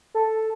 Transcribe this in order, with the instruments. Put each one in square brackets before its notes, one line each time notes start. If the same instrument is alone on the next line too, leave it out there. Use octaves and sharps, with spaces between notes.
[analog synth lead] A4